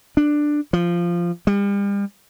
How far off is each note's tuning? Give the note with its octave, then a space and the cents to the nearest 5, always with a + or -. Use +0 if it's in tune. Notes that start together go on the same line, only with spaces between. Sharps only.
D4 +10
F3 -10
G3 +40